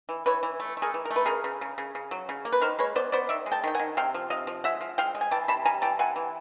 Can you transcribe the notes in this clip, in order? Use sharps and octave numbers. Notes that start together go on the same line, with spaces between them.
E3
E3 B4 C#5
E3
A3
A3
G#4 A#4
E3
A#4
A3
B4
C#3 G#4 A#4
C#3
C#3
C#3
C#3
F#3
C#3
A#3
B4
D#3 A#4 C5
G#3 B4 C#5
B3 C5 D5
B3 C5 D5
D#3 D5 E5
G#3
G5 A5
D#3 G5
F#5 G#5
D#3
C3 F5 G5
F3
C3 D#5 F5
F3
G#3 E5 F#5
F3
G#3 F5 G5
G#3
G#5
E3 G5 A5
C3 A5 B5
G3 G#5 A#5
E3 G5 A5
C3 F#5 G#5
E3